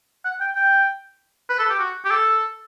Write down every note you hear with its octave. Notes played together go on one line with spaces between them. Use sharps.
F#5
G5
G5
B4
A4
G4
F#4
G4
A4